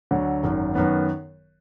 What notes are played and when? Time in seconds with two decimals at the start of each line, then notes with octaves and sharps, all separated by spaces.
0.11 D2 D3 F#3
0.44 G#1 F#2 D#3
0.75 F#2 D#3 F#3 B3